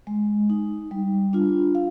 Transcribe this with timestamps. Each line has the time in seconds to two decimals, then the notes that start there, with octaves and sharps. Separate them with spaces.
0.07 G#3
0.50 D#4
0.91 G3
1.33 D4 F4
1.75 F5